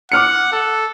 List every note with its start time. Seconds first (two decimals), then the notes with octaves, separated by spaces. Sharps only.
0.12 F#5 D6 F6 C#7
0.53 A4